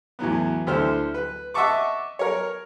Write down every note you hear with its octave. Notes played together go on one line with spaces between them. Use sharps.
E2 A2 F#3 B3
D2 E4 A4 C5 F6
B4
D#5 E5 F#5 A5 C#6 D6
A#4 C#5